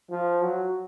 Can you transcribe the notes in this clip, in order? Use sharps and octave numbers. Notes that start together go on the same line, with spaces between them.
F3
F#3